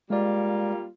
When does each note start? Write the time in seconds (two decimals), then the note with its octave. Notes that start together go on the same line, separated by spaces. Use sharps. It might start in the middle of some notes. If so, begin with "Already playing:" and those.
0.10 G3 G#3 A#3 F4 D5